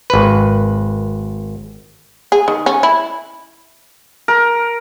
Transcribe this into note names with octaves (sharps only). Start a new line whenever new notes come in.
G#1 B4
G#4
D#3
C#4
E4
A#4